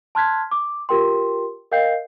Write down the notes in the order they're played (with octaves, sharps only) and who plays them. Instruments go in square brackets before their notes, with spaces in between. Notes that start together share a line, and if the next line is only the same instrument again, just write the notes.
[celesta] A5 C6 F6 F#6 G#6 B6
D6
F4 G4 A#4 G5 C6
A#4 D#5 F5 G5 G6 C7